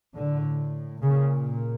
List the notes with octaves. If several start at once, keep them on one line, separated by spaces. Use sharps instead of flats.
A2 D3
A#2 C#3